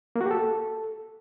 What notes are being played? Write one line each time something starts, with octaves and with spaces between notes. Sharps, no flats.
A#3
F#4
G4
A4